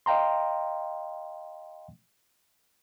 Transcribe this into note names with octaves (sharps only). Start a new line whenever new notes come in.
D#5 F5 G5 A#5 C6